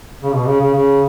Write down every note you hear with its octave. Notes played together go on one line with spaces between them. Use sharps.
C#3
B2
C#3
C#3
C#3